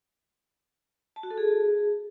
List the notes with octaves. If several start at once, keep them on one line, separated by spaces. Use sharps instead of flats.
A5
F#4
A4
G#4